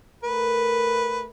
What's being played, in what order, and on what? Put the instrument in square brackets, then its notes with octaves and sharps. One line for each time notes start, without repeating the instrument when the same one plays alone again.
[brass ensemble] A3 A#4 [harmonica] B4